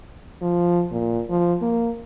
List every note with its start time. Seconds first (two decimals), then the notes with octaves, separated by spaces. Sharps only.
0.42 F3
0.92 A#2
1.30 F3
1.62 A#3